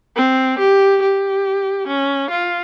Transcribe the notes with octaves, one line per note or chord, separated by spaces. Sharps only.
C4
G4
G4
C#4
F4